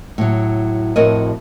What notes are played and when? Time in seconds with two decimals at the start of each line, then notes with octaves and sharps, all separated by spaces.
0.18 A2 F#3
0.96 F2 A2 F#4 A#4 C#5 D#5